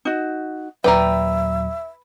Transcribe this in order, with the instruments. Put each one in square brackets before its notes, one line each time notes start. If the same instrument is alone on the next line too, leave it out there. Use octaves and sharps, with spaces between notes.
[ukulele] D#4 F#4
[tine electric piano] D#2 A#2 F#3 [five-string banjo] A#4 D5 G5 [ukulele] B4 [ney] E5